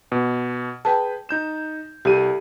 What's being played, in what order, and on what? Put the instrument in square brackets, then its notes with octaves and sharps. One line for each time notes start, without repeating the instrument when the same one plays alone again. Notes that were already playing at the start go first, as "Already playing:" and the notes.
[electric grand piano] B2
[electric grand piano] G#4 B4 G5 [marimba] A5
[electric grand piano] D#4 G6 E7
[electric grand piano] C2 A4 D#7 [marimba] G4